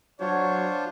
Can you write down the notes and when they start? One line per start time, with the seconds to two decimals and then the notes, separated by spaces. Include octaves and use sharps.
0.20 F#3 D4 F4 C5 C#5